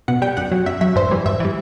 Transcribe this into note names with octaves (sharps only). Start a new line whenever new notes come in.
B2 F#5
G3 G5
F#2 F#5
F#3
F#2 E5
F#3 E5
G2 C5
E3 G3
G2 E5
E3 G3